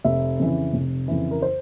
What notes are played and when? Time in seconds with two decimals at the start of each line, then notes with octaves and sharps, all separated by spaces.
0.04 F1 E5
0.39 F2 C#3 E3
0.73 F1
1.08 F2 C#3 E3
1.31 A#4
1.42 C5